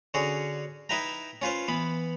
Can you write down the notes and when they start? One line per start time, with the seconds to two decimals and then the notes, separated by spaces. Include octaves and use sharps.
0.14 D3 C#4 F#4 G#4
0.89 D#4 E4 B4 E5 G5 A#5
1.42 C#4 F4 B4 C5
1.68 E3 B3 B5